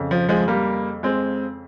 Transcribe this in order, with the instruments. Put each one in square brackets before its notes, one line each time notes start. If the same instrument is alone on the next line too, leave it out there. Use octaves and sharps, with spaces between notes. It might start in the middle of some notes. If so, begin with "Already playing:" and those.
Already playing: [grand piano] F2 C#3
F3
F3 G#3
G3 A#3
G#3 C4